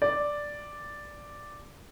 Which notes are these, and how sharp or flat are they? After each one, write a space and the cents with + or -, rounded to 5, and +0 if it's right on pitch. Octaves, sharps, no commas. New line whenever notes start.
D5 +0